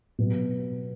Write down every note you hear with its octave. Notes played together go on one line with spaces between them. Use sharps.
B2 F#3 B3